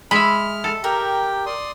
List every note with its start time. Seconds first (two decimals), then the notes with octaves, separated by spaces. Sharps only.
0.11 G#3 E5 B5 F6
0.64 A4
0.84 G4 A#4 G5
1.46 D5 C6 D#6